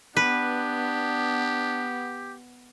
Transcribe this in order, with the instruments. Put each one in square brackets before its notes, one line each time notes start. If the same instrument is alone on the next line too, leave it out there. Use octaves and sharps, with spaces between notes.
[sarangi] B3 [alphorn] D4 [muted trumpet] G4 [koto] B4